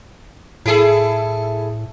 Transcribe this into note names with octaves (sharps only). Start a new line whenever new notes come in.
A2 E4 G#4 A4